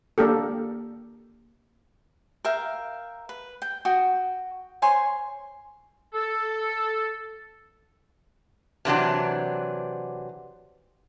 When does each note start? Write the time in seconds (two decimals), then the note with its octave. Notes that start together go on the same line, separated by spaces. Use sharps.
0.18 A#3 D4 G4 A4
2.45 A#4 E5 F5 G5
3.29 B4
3.62 G5
3.85 F#4 G5 D#6
4.82 C5 C#5 G#5 C6
6.14 A4
8.85 C3 E3 F#3 D4